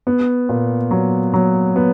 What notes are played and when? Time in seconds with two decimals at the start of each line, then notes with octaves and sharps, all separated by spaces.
0.07 B3
0.49 A#2
0.91 F#3
1.34 F#3
1.76 B3